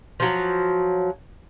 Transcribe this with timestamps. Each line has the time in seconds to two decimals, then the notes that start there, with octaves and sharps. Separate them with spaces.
0.20 F3 F#3